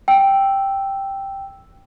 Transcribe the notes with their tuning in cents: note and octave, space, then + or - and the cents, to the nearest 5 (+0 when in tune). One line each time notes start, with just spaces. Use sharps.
G5 +0 E6 +0